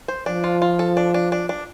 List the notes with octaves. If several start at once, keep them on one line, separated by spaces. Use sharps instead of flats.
C5
F3 D4
F4
F4
A4
D4
D4
D4
D4